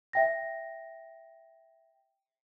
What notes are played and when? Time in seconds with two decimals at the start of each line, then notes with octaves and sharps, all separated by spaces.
0.13 E5 G5 A#6